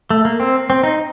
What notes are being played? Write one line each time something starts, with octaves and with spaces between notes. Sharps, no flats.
A3
A#3
C4
C4
D#4